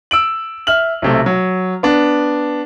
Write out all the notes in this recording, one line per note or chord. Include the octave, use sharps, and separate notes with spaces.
E6 D7 F#7
E5 F6 F#7
B1 C3 A3
F#3
B3 D4